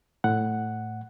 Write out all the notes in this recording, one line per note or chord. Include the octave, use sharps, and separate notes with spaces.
A2 F#5